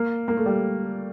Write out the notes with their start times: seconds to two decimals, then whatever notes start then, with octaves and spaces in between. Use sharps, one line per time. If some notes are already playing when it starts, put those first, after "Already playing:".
Already playing: A#3
0.28 A#3
0.37 A3
0.46 G3